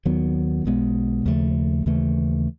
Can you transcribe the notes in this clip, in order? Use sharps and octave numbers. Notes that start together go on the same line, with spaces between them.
D#2 D#3 F#3 B3
B1 B2 G#3 B3
D#2 C#3 F3 A3
D#2 C#3 E3 A3